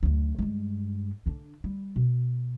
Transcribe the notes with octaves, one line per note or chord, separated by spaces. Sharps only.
F#1 D2
G2 G#3
D3 D4
G3
B2